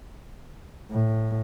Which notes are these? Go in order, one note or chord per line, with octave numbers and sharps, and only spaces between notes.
A2